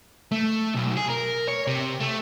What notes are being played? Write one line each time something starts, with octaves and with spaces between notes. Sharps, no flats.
A3
B1
G#4
A#4
C#5
C3
A3